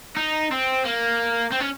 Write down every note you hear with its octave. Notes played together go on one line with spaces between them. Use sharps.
D#4
C4
A#3
C4
C#4